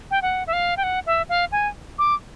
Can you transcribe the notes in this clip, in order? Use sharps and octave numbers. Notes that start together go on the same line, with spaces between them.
G5
F#5
E5
F5
G5
F#5
E5
F5
G#5
D6